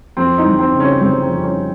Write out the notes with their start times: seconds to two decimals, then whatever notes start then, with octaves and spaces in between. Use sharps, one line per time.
0.17 F2 C4
0.38 D#4
0.45 G1
0.59 C4
0.73 C#3
0.80 C#4
1.01 G1 C4
1.22 C4
1.29 F2
1.43 C#4